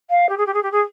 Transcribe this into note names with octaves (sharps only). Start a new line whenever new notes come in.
F5
G4
G#4
G4
G#4
G4
G#4